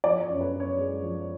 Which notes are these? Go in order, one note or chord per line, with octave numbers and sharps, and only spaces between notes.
F3 D5
C#5
F#2
B4
F#2
C#5
G#3
F3